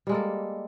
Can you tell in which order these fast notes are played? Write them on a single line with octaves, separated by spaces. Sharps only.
G3 G#3 A#3 A4